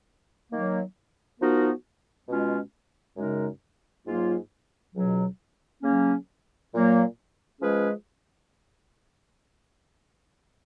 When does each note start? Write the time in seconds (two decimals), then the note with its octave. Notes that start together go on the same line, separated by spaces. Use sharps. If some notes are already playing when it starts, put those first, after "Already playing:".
0.51 D#3 F#3 A#3
1.39 F3 B3 D#4 F#4 A#4
2.28 B2 G#3 C#4 F4
3.17 F#2 C#3 G#3 D#4 A#4
4.06 G#2 F#3 A#3 F4
4.95 C#2 B2 F#3
5.83 C#3 F#3 A#3 C#4
6.72 A#2 F#3 A#3
7.61 F3 G#3 C#4 G#4 B4